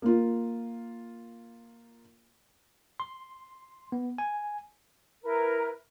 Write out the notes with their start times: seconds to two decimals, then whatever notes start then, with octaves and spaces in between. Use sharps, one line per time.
0.02 A#3 F4
3.00 C6
3.92 B3
4.18 G#5
5.22 E4 A#4 B4